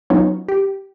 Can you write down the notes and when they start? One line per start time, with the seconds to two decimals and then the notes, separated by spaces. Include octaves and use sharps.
0.10 F#3 B3 C#4 D#4 F4 C#5
0.49 G4